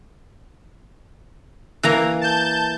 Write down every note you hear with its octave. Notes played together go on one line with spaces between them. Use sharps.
E3 A#3 A#5
A5 G6